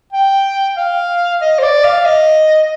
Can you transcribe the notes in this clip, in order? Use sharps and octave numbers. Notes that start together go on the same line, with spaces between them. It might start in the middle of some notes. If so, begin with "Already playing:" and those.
G5
F5
D#5
C5
D5
F5
D#5